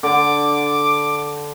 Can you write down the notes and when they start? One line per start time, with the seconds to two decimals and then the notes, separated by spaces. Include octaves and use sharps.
0.03 D3 D6